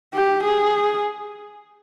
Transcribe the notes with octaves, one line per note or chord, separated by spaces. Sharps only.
G4
G#4